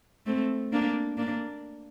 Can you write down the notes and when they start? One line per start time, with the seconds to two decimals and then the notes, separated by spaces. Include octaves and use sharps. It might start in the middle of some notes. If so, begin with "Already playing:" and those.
0.26 A3 C4
0.73 A#3 D4
1.18 A#3 D4